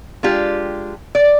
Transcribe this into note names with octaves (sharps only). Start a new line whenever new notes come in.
G#3 D4 F4 G4
D5